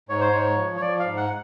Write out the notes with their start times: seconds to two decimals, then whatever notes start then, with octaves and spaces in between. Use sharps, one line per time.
0.09 G#2 C#5
0.21 C5
0.31 G#2 C#5
0.57 F3
0.77 C#5
0.81 F3 D5
1.00 G#2 F5
1.17 F#5